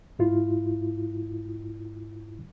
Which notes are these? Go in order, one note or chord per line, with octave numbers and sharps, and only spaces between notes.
G#2 E4 F4